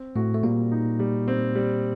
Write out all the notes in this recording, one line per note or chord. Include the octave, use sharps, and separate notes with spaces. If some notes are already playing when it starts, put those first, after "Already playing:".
Already playing: C4
A2 A3 F#4
A3
A#2 G3 A#3
D#4
G3
C4
G3